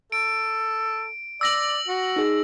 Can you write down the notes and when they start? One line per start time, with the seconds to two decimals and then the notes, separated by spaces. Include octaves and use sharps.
0.12 A4 D7
1.41 D5 E6 A#6 F#7
1.88 F#4
2.16 D#4 G#4